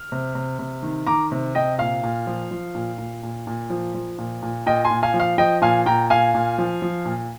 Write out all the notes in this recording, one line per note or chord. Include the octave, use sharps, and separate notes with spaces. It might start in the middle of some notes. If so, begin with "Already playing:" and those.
Already playing: F6
C3
C3
C3
D#3
D#3 A#5 D6
C3
C3 D#5 G5
A#2 F5
A#2
F3
F3
A#2
A#2
A#2
A#2
F3
F3
A#2
A#2
A#2 D#5 G5
G#5 C6
A#2
F5 G#5
F3
F5
F3 D#5 G5
A#2 F5 G#5
A#2 G5 A#5
A#2 F5 G#5
A#2
F3
F3
A#2